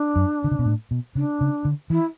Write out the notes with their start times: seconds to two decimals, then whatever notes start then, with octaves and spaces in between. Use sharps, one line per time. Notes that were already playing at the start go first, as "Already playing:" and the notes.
Already playing: D4
0.16 F#2
0.44 D3
0.51 C#3
0.59 B2
0.65 A2
0.91 B2
1.15 C#3 D4
1.41 C#3
1.65 D3
1.90 E3 E4